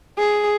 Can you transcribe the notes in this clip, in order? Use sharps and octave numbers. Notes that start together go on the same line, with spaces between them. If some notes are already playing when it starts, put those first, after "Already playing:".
G#4